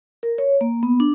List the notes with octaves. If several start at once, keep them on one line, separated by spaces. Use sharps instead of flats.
A#4
C#5
A#3
B3
D4